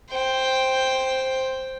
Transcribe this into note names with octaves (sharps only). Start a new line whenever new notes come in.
C5 G5